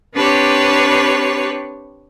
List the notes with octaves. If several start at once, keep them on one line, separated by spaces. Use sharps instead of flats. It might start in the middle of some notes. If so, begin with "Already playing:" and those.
C4 D4 G4 B4 C#5